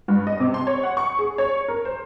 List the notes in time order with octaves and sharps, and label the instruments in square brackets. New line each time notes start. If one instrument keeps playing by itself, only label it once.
[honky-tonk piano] G2
D#5
C3
C6
C#5
F#5
C#6
G#4
C#5
A#4
C5